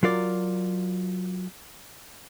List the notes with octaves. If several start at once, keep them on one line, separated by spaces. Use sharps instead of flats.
F#3 F4 A#4 D5